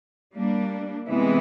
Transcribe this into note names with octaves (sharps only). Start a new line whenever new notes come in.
G3 A#3 D4
C3 E3 G#3 B3 E4